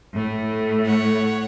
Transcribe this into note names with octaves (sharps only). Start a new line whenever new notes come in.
A2 A3
C#5 F#5